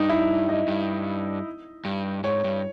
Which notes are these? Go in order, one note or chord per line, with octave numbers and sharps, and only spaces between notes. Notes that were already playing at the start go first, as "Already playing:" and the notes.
Already playing: G2 D#4
E4
D#5
G2
G2
G#2 C#5
G2